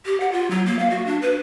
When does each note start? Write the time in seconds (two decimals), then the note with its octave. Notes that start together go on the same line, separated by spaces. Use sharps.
0.06 G4
0.20 F#5
0.32 F4
0.51 F#3
0.66 A#3
0.79 F5
0.90 F#4
1.06 D4
1.22 B4